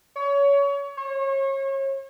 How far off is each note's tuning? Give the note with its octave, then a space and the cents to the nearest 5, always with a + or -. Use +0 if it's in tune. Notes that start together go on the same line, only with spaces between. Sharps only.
C#5 +25
C#5 -35